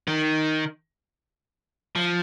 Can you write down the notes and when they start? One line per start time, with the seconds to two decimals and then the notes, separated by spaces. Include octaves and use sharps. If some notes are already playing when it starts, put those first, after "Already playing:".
0.08 D#3
1.96 F3